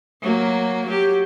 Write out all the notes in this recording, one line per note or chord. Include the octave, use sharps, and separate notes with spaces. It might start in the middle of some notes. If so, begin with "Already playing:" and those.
F#3 A#3
F#3 G4